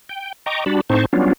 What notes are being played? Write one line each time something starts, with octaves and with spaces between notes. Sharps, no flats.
G5
D#5 G5 A#5 C#6 D6
G3 D4 F#4 A5 B5
A2 C4 D#4 C5 A5 C#6
F#3 G3 B3 C#4 D4 F4